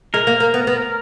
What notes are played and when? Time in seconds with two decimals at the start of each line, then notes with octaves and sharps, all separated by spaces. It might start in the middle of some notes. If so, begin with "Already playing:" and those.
0.14 G#3 A#4
0.27 A#3
0.40 A#3
0.54 B3
0.67 B3